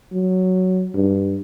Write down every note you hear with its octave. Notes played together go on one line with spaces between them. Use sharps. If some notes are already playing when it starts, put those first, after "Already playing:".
F#3
G2